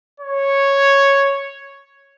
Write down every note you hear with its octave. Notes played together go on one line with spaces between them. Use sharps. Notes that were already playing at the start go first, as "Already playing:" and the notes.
C#5